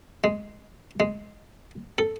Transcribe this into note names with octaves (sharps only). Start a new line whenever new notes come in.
G#3
G#3
A4